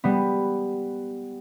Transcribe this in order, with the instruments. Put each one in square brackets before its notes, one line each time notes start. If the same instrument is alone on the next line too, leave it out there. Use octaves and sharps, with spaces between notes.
[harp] G3 B3